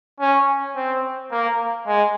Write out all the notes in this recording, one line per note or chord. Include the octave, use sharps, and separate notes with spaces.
C#4
C4
A#3
G#3